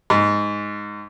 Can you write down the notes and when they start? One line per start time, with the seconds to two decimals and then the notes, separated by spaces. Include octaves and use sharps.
0.10 G#2